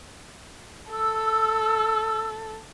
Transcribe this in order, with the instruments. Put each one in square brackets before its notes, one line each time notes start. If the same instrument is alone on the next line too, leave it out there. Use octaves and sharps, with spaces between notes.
[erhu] A4 [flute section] E6